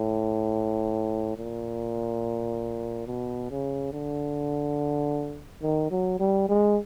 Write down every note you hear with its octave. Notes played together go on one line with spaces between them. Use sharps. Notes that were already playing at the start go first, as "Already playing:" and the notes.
Already playing: A2
A#2
B2
C#3
D3
D#3
F#3
G3
G#3